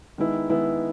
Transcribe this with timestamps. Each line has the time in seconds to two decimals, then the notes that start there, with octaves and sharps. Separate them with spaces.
0.18 D#3 G#3 B3 E4
0.49 D#3 G#3 B3 E4